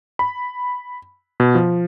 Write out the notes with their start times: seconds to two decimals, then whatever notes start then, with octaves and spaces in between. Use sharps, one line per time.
0.19 B5
1.40 B2
1.55 F3